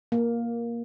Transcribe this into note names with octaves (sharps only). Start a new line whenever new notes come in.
A#3